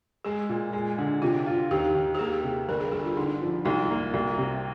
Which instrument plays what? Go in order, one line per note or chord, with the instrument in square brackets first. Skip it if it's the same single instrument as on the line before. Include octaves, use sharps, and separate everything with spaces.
[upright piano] G#3 [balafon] G#4
[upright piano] A#2
G#3
D3
[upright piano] C3 [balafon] F4
[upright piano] F4
[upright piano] D#2 [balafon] G4
[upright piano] D#2
[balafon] G4
[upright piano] A#3 [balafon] G#4
[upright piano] C3
[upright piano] G1 [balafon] A#4
[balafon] G#4
[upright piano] G1 [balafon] G#4
[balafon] F4
[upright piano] D3 [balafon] D#4
[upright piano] F3
[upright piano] C2 [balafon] D#4
[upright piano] A#3
C2
C3